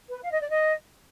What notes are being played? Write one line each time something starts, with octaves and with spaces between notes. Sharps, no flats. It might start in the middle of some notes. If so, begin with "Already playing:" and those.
B4
F5
D#5
D5
D#5